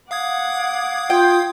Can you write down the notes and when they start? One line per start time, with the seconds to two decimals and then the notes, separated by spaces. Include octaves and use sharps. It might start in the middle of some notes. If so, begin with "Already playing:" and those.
0.11 F5 F#5 D6 D#6 G#6
1.10 F4 G5